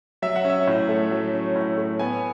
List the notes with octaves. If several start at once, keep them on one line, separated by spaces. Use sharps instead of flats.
F#3 E5
F#5
C#4
E5
A2
A3
F#3
C#4
A2
A3
B3 G#5